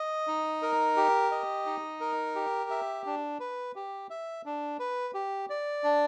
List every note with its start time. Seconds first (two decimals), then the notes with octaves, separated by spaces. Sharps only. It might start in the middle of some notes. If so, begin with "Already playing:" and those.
Already playing: D#5
0.27 D#4
0.62 A#4
0.96 G4
1.31 D#5
1.66 D#4
2.01 A#4
2.35 G4
2.70 E5
3.06 D4
3.40 B4
3.76 G4
4.10 E5
4.46 D4
4.80 B4
5.14 G4
5.50 D5
5.84 D4